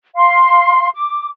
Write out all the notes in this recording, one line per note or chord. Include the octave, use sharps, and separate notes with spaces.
F5 C6
D6